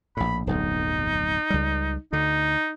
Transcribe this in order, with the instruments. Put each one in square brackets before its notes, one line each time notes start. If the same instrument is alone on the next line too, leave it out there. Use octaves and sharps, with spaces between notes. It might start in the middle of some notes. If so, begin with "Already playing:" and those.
[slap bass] A#1 A2 [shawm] B5
[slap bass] D1 B1 F2 [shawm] D#4
[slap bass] C#2 G3
[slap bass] D2 D3 [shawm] D#4